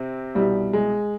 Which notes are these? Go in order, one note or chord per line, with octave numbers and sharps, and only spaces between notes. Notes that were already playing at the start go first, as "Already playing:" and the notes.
Already playing: C3 C4
C2 B2 G3
G#3